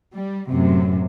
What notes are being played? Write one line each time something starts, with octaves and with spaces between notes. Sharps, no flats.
G3
F#2 A2 C3